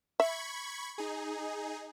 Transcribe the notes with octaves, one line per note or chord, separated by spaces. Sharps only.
E5 B5 C#6 G#6
D#4 G#4